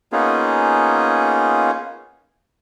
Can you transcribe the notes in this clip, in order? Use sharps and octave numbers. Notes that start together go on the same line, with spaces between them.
A#3 B3 C#4 D#4 F4 G#4